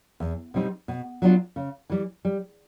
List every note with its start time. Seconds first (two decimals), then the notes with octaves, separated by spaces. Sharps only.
0.20 E2
0.54 B2 G3 C4 D#4
0.88 B2
1.22 F#3 B3 D4 F4
1.56 C#3
1.90 E3 G3
2.25 G3